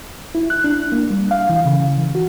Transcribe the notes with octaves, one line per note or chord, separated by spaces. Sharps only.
E4
F#6
D4
A#3
G3
F5
E3
C#3
E3
F#4